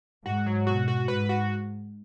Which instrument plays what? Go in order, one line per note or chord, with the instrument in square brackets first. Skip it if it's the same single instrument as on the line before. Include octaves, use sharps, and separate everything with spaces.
[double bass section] G#2 [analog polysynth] F#4
[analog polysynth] F#3
[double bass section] B2 [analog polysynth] F#4
[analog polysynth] F#4
[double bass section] G#2 [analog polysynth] B4
[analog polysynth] F#4